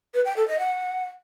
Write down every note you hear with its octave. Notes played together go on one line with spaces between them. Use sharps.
B4
G5
A4
D#5
F#5